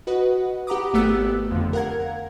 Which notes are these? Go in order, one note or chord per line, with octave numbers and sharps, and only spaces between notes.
F#4 B4 D#5 F#5
G4 F#5 A#5 B5 D6 D#6
G#1 A3 B3 G4 E6 F#6
F2 D3
A#4 F5 F#5 A#5 G#6